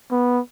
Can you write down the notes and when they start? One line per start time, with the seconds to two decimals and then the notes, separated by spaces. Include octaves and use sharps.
0.12 B3